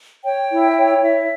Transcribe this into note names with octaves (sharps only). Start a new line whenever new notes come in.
C#5 G5
E4
C#5
E4 E5